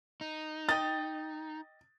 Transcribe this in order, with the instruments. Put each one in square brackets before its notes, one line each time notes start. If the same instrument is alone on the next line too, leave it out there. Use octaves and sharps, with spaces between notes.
[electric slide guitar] D#4
[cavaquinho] D#5 G5 [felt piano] A6